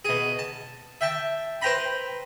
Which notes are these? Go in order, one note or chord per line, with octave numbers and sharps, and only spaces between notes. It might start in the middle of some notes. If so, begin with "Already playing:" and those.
B2 G#4
A5
E5 G5 A5
B4 C5 G5 A#5 B5